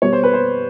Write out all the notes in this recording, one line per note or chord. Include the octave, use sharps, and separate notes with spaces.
B2 G3 C#5
C5
B4
C5